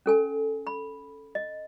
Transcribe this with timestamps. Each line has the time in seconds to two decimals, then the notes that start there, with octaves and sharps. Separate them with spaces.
0.06 C#4 A4 G#5
0.67 B5
1.35 D#5